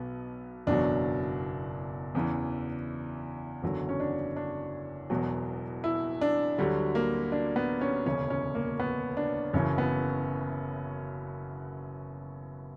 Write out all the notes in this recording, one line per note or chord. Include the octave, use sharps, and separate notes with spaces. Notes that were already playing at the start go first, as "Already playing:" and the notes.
Already playing: B1 B2 F#3 B3
F#1 E2 B2 F#3 D4
E2 C#3 E3
F#1 E2 D3 F#3
C#4
D4
D4
E1 E2 B2 F#3
E4
D4
D2 D3 F#3 G3
A#3
D4
B3
C#4
E1 D2 C#3 C#4
C#4
A#3
B3
D4
F#1 F#2 C#3 E3 C#4
B3